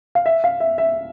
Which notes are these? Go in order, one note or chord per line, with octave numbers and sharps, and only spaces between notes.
F5
E5
F5
E5
E5